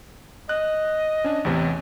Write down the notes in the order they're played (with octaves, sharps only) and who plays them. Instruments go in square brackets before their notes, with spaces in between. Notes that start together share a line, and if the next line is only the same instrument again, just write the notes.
[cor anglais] D#5 [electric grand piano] F#6
[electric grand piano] C#4 D4
A1 E2 C3